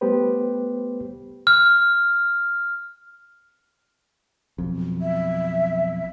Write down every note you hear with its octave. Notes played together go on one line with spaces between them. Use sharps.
G3 A3 B3 G4 B4 C5
F6
B1 F2
E5